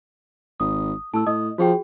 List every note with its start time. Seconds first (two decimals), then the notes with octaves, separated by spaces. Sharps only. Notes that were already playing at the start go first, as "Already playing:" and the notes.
0.60 G#1 D#6
1.14 A2 A5 E6
1.27 A2 D#5 D#6
1.58 F3 F#4 G#4 G5